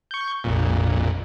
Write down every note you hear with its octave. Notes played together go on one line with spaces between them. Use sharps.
C#6 G6
A#1 F2 A#2